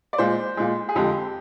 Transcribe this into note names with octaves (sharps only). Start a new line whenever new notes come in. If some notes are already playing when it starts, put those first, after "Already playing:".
D5
A#2 G#3 C5
A#2 G#3
G#4
F2 D3 G#3 G4